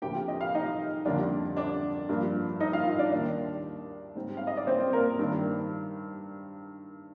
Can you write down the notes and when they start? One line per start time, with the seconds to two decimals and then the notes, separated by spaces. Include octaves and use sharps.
0.02 D2 C3 F3 A#3 G4 G5
0.28 D#5
0.41 F5
0.55 D#4 D#5
1.05 F2 D3 G3 A#3 D4
1.57 D4 D5
2.09 G2 F3 A#3 D4
2.60 D#4 D#5
2.73 F4 F5
2.99 D4 D5
3.12 D#2 D#3 G3 A#3 D4 D5
4.15 G#2 G3 C4
4.37 F5
4.47 D#5
4.57 D5
4.67 C4 C5
4.93 A#3 A#4
5.19 G2 D#3 A#3 D4